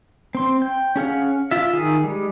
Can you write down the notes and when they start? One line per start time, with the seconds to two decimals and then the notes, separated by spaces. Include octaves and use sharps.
0.35 C4 C6
0.62 G5
0.96 C#4 G#4 F5 F#5
1.51 F4 E5
1.73 D#3 G#4
2.04 G3 G#3